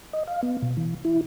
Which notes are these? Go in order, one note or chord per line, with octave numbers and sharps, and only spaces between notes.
D#5
F5
B3
B2
E3
E4